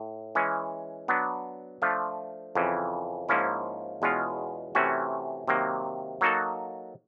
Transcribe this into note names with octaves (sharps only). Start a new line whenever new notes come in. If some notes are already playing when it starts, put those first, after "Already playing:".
Already playing: A2
E3 G#3 C#4
F#3 B3 D4
F3 A3 D4 F4
F2 C#3 E3
G#2 F3 A#3 C#4 E4
E2 B2 G#3 C#4 F4
C3 E3 A3 C#4 F#4
C3 D#3 F#3 A#3
F#3 A#3 D#4 F#4 A4